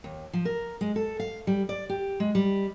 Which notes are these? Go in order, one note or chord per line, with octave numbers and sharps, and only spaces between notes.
D#2
F3
A#4
G#3
A4
F5
G3
D5
G4
G#3
G3